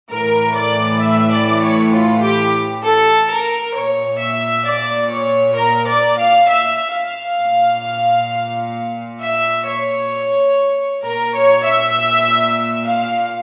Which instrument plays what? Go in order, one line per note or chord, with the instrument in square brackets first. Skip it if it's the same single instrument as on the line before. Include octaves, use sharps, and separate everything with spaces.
[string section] A2 E3 A#4
D5
E5
D5
C#5
F4
G4
A4
A#4
A#2 C#5
E5
D5
C#5
A#4
D5
F5
E5
F5
A#2
E5
C#5
A#2 A#4
C#5
E5
F5